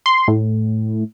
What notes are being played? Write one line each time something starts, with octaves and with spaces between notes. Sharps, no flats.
C6
A2